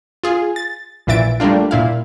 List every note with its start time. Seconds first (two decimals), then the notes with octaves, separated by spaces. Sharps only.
0.24 F4 G#4
0.56 A6
1.07 A#1 A#2 E3 E5 A6 D7
1.40 G3 A3 A#3 D4 F4
1.71 A#2 E4 F5